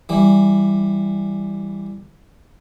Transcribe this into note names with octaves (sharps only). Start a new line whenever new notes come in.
E3 G3